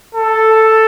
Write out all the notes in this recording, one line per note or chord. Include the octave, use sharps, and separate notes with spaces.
A4